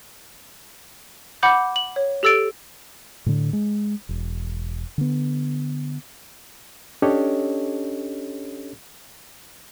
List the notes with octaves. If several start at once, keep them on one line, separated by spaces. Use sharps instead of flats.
F#5 B5 D6 G6
F#7
C#5
G4 A4 E6 A6 D7
A2 D3
G#3
E1
D3 B3
C#4 D4 G4 A4 C#5 D#5